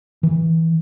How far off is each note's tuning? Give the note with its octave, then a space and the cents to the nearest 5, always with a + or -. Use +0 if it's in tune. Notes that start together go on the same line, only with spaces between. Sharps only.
E3 -20